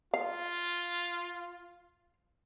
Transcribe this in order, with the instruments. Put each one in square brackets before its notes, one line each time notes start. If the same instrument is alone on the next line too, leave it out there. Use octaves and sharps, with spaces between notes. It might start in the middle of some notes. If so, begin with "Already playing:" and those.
[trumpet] F4 [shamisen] F5